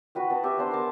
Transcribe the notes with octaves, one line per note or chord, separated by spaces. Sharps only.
F#4 B4 G5
B4 D#5 A5
G4 E5 G#5
B3 D4 C5
A#4 G#5 A5